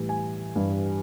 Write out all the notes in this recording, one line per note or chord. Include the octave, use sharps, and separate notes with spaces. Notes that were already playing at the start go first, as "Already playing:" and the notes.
Already playing: A2 E3 G3
G#5
G2 E3 G3